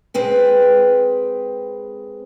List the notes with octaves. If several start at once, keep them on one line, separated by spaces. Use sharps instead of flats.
G#3 C4 B4 G5